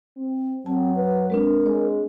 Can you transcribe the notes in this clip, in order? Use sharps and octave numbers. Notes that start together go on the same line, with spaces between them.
C4
F#2 F#3 C4 A5
B4
G#3 C4 D4 A#4
G#3 C#5